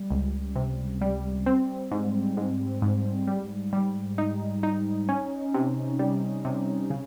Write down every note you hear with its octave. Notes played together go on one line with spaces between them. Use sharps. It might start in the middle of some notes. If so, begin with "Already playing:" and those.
Already playing: G3
C#2
C3
G3
C4
G#2
G#2
G#2
G3
G3
D#4
D#4
C#4
C3
G3
C3
C#3